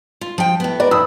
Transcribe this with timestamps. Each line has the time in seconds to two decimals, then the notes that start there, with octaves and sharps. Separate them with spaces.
0.21 F4
0.38 F3 G5
0.60 A2 B3
0.80 A#4 B4 D5
0.91 F2 B5 D#6 E6